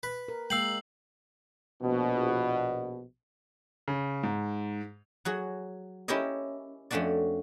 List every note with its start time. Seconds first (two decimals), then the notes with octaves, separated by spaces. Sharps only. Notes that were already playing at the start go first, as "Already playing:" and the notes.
0.03 B4
0.28 A#4
0.50 G#3 A#3 F5 G5 E6 C7 F#7
1.82 A#1 B2
3.88 C#3
4.23 G#2
5.25 F#3 F#4 G#4
6.08 C#4 E4 G4 A#4 C#5 D#5
6.91 F2 A3 C#4 D4 F#4 D5